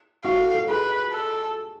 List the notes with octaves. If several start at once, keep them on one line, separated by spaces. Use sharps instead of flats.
F#4 F5
A4
A4
G#4 B4
A4